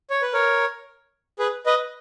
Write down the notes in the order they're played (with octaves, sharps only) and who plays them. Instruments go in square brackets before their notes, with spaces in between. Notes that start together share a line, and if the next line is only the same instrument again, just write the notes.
[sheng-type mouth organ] C#5
B4
A#4 C#5
G#4 B4
B4 D#5